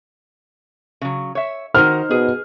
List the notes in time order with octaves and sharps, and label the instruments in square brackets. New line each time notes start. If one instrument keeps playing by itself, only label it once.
[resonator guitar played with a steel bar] C#3 F#3
C#5 E5
[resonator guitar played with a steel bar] D#3 F#4 A#4 [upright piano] D#4 C5 [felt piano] F6
[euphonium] B2 [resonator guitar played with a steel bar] G#4 G#5